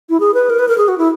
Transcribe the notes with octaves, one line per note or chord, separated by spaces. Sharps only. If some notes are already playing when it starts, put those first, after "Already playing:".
E4
G#4
B4
A#4
B4
A#4
G#4
F#4
E4